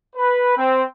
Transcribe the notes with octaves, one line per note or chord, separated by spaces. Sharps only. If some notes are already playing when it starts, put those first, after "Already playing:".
B4
C4